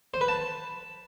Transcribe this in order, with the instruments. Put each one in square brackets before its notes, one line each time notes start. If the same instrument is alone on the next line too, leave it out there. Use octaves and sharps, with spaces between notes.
[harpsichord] C5
B4
A5